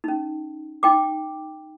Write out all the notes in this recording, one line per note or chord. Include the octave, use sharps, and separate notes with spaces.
C#4 D#4
D#4 G5 D6